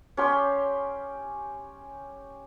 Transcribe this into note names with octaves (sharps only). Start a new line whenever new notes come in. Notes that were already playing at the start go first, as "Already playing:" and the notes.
C#4 G4 C6